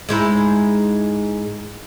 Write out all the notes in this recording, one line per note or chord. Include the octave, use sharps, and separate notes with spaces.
G#2 G#3 E4